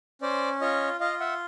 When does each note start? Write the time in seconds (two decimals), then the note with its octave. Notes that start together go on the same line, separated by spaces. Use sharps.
0.21 C#4 C5 D5
0.61 F4 C#5 D#5
1.00 F4 D#5 F5
1.20 E5 F#5